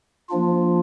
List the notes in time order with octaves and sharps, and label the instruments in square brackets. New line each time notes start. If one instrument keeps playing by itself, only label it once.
[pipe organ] F3 A#3 D4 F4